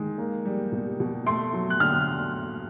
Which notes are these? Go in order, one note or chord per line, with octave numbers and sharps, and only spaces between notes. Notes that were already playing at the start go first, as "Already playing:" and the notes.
Already playing: D#3 G#3
A#3
G3
B2
B2
A3 C6
F#3
F#6
D3 F6